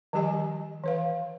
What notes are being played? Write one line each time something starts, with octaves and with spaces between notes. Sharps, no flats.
D#3 F3 G3 G4 D#5 G#5
E3 B4 F5